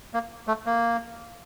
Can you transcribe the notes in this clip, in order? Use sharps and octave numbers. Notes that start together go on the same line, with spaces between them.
A#3
A3
A#3